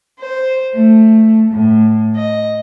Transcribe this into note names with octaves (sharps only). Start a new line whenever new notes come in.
C5
A3
A2
D#5